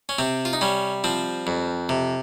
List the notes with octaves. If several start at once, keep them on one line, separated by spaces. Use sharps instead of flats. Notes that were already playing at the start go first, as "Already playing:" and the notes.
C#4
C3 C4
F4
D#4
G3 C#4
F3 C4
F2
C3